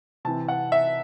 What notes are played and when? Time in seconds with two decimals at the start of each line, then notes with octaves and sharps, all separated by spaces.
0.25 C3 E3 A5
0.48 F#5
0.72 E5